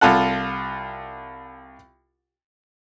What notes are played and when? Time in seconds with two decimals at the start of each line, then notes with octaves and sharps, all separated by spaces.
0.01 C2 F4 A4 F#5